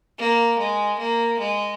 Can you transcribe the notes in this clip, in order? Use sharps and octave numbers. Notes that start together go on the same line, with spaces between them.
A#3
G#3
A#3
G#3